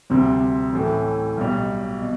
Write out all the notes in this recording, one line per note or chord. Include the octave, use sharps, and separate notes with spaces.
D2 C3 G3 C4
A1 A2 E3 A3
B1 B2 G3
B2